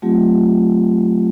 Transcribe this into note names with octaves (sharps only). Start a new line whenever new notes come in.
F#3 A3 C4 F4 G4